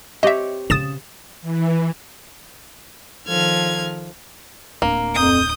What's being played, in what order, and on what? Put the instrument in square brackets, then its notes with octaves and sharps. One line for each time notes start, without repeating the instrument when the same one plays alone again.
[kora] C4 G4 C#5 [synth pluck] D#5 E5
[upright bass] C#3 [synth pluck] D#6 A6 E7
[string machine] E3
[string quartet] D#3 F3 A4 F6 G#6
[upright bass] D1 D4 [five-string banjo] A#3
[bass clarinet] F2 [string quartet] D#6 G6